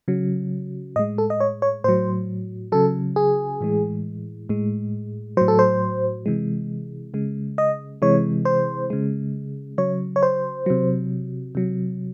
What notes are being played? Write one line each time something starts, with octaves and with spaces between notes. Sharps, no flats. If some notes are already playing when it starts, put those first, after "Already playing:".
C#3 F#3
A2 G#3 D#5
A4
D#5
C#5
C#5
A2 F#3 C5
C#3 F#3 A4
G#4
A2 E3 G#3
A2 G#3
A2 F#3 C5
A4
C5
C3 E3 G#3
C#3 G#3
D#5
C3 E3 G#3 C#5
C5
C#3 G#3
C#3 F#3 C#5
C#5
C5
C3 F#3
C3 F#3